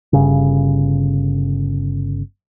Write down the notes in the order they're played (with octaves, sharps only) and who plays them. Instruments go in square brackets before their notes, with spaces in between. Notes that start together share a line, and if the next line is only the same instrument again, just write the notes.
[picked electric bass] G1 C#3